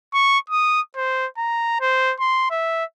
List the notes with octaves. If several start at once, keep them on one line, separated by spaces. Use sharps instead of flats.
C#6
D#6
C5
A#5
C5
C6
E5